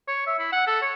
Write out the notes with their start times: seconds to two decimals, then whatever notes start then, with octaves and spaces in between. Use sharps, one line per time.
0.08 C#5
0.26 E5
0.39 E4
0.52 F#5
0.67 A4
0.82 C#5